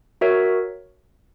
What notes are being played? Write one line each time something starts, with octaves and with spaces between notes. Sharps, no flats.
F#4 A#4 C#5 E5